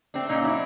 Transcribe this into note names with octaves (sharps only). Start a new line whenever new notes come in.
A3 C4 D4
A#2 C#4 D#4
F#3 D4 E4